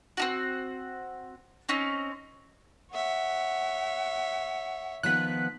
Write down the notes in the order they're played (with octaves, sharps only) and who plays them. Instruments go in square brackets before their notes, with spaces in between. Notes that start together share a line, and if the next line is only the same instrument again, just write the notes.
[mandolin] C4 D#4 F#4
C4 C#4 D#4
[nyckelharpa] C#5 E5 [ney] F#5
[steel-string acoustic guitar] D#3 F3 B3 [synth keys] F#6 B6